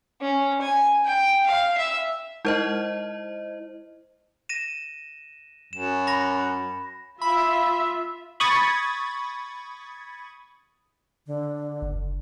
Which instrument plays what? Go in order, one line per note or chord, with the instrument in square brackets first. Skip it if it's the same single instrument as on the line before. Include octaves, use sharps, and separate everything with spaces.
[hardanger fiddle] C#4
G#5
G5
F5
E5
[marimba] G#3 D#4 A#4 [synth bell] E4 C5 D#5
[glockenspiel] A#6 D#7 E7
[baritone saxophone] F#2 [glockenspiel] E7
[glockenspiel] B5 A#6
[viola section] F4 E5 [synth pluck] B5
[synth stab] B5 C#6 D#6 G#6 A6
[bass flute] D3
[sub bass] F#1